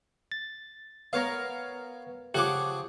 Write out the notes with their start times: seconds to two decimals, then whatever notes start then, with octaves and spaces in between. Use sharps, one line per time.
0.32 A6
1.13 B3 A#4 C#5 F5
2.34 C#3 F3 G4 G#4 F#5 D6